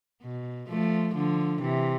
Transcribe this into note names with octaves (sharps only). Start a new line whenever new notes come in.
B2
F3 A3
D3 F3
C3 E3